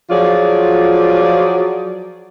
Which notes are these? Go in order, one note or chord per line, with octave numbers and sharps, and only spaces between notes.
F3 F#3 F4 G#4 D5